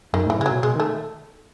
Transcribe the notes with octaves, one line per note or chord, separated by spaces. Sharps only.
F#2 D#3
A2
E3
C#3
G#3
F#3
B2
B2 G#3
D#3
A3